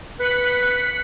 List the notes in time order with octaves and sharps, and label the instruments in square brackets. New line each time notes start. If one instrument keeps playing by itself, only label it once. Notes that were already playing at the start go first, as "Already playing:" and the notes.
[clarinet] B4 [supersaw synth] F#6 B6 C#7